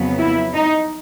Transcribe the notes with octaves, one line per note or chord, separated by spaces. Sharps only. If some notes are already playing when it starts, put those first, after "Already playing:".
Already playing: F2 C#3 F#3 B3
E4
D#4